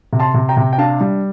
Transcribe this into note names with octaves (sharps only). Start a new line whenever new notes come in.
C3
A5 C6
C3
G5 A#5
C3
G5
D4 F5 A5
G3